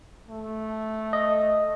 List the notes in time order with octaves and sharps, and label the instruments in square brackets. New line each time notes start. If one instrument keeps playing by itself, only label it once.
[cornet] A3
[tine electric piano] D#5